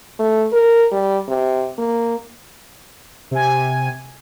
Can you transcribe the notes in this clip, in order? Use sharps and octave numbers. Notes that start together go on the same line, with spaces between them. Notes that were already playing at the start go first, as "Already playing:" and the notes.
A3
A#4
G3
C3
A#3
C3 G#5